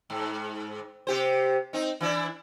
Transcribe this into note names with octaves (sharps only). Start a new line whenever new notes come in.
G#2
C3 G4 C5
C4 D#4
E3 D4 E4